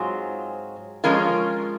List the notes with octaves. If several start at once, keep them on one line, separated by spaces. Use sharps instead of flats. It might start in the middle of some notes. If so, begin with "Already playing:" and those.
Already playing: G#2 F#3 C4 F4 G#4
F3 G#3 C#4 F4 A#4